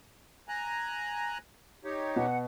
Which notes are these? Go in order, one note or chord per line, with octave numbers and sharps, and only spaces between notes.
G#5 A#5 F#6
D#4 G4 C#5
B2 F#5